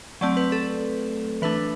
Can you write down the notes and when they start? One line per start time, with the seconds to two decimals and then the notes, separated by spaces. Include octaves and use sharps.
0.21 F#3 A3 C4 D5
0.37 B4
0.52 A4
1.42 E3 A3 D4 B4